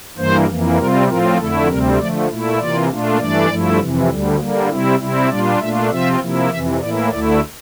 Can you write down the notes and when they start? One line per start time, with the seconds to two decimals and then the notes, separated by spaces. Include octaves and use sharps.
0.18 G2 E3 A#3 C5
0.48 F2 E3 A#3
0.78 C3 G3 C4 F4 A#4
1.08 A2 F3 C4 F4 A#4
1.38 F2 D3 A3 E4 A4
1.68 D2 C3 G3 C4 A#4
1.99 D3 F3 A3 D5
2.29 A#2 A3 E4
2.58 C3 E3 A#3 F4 D5
2.89 A#2 A3 D4 F4
3.18 G2 E3 A3 D4 D5
3.50 G2 F3 A3 E4
3.80 F2 C3 E3
4.10 D2 D3 G3
4.39 D3 G3 A#3
4.69 C3 G3 C4 E4
4.99 C3 G3 C4 E4
5.29 A#2 G3 D4 F4 D5
5.60 A#2 A3 D4 F4 E5
5.90 C3 F3 C4 F4 E5
6.20 C3 F3 A#3 E4
6.50 F2 C3 E3 E5
6.80 A2 E3 A#3 E4 D5
7.10 D2 D3 A3 E4 D5